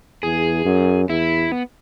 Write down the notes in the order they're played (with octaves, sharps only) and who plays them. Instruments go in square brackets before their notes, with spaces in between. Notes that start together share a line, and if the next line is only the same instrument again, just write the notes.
[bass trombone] E2 [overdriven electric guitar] G#4
[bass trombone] F#2
[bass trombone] E2 [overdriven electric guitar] E4
[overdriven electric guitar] B3